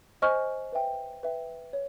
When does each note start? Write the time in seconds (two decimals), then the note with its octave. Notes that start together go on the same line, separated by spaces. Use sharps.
0.22 C5 D#5 G#5 C#6 F6
0.72 B4 E5 G5
1.23 B4 E5 G5
1.73 C#5